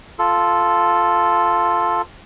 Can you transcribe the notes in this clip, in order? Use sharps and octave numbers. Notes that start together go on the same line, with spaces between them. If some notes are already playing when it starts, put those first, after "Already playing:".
F4 A4